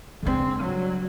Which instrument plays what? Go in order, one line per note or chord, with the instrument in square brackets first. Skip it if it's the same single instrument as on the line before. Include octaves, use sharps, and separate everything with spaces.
[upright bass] C#3 D4 [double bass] G#3 C4
[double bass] F#3 G3